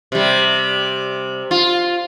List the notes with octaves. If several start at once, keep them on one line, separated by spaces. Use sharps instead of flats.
C3 G3
F4